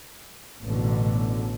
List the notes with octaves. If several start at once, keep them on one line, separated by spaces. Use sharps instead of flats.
A1 B2 D3